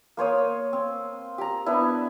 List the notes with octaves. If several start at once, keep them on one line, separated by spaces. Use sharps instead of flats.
A#3 C5 C#5 D#6
C4
G4 A#5
B3 D4 E4